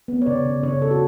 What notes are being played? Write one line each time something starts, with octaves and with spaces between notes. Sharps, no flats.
B3
C#5
C#3 D5
C#3
C#3 C#5
C#3 A4
F#4